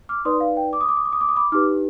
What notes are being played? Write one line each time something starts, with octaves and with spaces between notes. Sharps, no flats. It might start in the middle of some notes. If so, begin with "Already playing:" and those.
D6 F6
D#4 B4 D5 C6 D#6
F5
G5
D6
D#6
D6
D#6
D6
D#6
D6
D#6
B5 D6
D#4 G4 B4 D6 F6